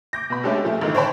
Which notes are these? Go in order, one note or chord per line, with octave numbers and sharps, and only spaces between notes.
D6 G6 A#6
B2 B5
G#3 A3 C#4 D4 G4 A4
A#2 F3 A3
A1 G#2 D3 D#3
C5 C#5 G5 A5 B5 C6